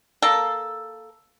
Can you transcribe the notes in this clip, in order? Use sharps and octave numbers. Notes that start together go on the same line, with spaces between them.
A#3 A4